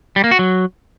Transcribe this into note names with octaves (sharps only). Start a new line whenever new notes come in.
G3
A#3
F#4
F#3